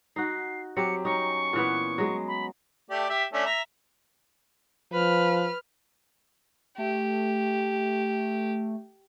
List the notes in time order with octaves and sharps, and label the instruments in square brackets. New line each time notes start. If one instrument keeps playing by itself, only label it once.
[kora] D#4 F#4 [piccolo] C7
[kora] F#3 C4 G4 [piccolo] C#7
[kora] C#4 D#4 [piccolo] C#6
[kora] A#2 E3 B3
F#3 G#3
[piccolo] B5
[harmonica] A3 G4 D5
G4 E5
A3 C#4 D4
E5 A#5
[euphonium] F3 [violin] B4 F6
[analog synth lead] A3 [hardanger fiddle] G4